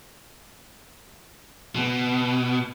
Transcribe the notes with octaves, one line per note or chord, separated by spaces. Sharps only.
B2